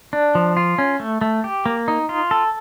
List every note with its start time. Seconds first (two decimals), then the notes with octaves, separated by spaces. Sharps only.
0.13 D4
0.35 F3
0.57 F4
0.78 C#4
1.00 A3
1.21 A3
1.44 G4
1.66 A#3
1.88 D#4
2.09 F4
2.31 A4